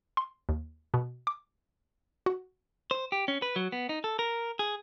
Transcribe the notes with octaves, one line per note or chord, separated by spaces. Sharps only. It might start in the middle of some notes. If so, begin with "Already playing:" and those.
C6
D#2
B2
D6
F#4
C5
G4
C#4
B4
F#3
B3
D#4
A4
A#4
G#4